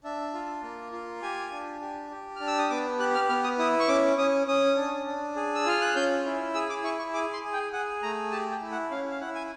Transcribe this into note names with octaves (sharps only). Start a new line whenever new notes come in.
D4 E5
F4
A#3
F4
G4 G#5
D4
G4
G4
D4 F6
E6
D#6
B3 D6
G4 F#6
F6
B3 F6
D#6
E4 D#6
C#6
C#4 D6
C#4 D#6
C#4 D#6
D4
D4
G#4
E6
F4 F6
F#6
C#4 G6
E4
G#4 E6
D6
E4 C#6
C#6
G#4 D6
C6
G#4
G5
G#4 F#5
A3 A#5
G4 A5
G5
E4
F#5
C#4 F5
F5
E4 F#5
G#5